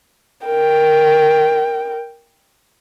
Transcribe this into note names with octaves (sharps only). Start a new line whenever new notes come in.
A#4 G5